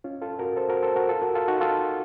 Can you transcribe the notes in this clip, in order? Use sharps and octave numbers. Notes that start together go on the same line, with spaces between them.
C#4 F4
F4 A4
F#4 A#4
A4 C5
F#4 A#4
A4 C5
F#4 A#4
F4 A4
F#4 A#4
F4 A4
D#4 F#4
F4 A4